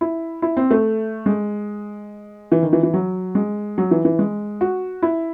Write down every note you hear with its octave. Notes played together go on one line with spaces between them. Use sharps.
E4
E4
C4
A3
G#3
E3
D#3
E3
E3
F#3
G#3
F#3
E3
E3
G#3
F#4
E4